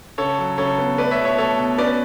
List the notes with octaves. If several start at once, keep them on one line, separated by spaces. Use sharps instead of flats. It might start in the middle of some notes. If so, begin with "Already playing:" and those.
C#3 A4 C#5
F#3
C#3 A4 C#5
B3
A3 B4 D5
C#5 E5
B2
C#5 E5
A3 A4 C#5
B2
C#4 B4 D5